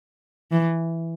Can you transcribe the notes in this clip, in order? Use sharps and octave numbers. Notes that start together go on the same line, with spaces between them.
E3